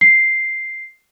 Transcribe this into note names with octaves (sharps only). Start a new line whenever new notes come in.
C7